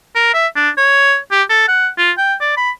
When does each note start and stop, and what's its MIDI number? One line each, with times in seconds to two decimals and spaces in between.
0.15 0.34 70
0.34 0.47 76
0.56 0.70 62
0.78 1.17 73
1.32 1.43 67
1.49 1.66 69
1.68 1.88 78
1.98 2.12 65
2.18 2.34 79
2.41 2.53 74
2.57 2.70 83